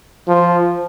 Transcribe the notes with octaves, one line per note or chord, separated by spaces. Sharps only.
F3